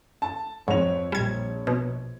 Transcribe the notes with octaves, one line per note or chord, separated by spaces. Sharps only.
A5
F2 G#2 C#5 F7
A#1 G3 G#6
B2